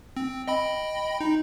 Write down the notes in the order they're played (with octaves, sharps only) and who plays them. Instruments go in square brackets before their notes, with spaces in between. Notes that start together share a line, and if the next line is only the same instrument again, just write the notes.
[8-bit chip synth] C4
D#5 G5 B5
D#4